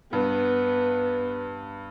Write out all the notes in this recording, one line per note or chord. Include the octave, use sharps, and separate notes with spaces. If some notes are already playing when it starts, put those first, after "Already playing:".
G2 B3